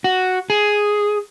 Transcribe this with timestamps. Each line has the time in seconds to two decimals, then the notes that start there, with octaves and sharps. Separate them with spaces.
0.04 F#4
0.50 G#4